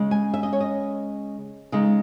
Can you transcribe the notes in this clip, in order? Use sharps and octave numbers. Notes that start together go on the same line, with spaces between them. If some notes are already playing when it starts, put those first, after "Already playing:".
Already playing: C#3 G#3
G#5
E5
D#5
C#5
D#5
C#3 G#3 D#4